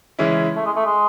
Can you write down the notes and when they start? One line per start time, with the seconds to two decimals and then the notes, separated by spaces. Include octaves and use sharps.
0.19 C#3 E3 G#3 C#4 E4
0.56 A3
0.66 G#3
0.76 A3
0.86 G#3